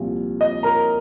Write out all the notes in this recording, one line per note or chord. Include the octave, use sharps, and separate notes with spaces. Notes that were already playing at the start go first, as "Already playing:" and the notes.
Already playing: C2 A#2 F3
D#5
A#4 A#5